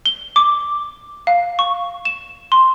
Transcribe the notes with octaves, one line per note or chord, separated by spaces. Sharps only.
G7
D6
F5
C#6
E7
C6